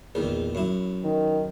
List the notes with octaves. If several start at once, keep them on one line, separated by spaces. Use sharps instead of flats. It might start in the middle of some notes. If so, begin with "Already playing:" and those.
A#1 E2 D#3
F#2 E4
D#3